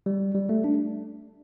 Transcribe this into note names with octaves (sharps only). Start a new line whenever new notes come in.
G3
G3
A3
D4